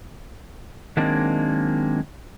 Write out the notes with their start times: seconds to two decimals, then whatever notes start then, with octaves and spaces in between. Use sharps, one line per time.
0.97 D#3 F#3 G#3 A#3 C4 D4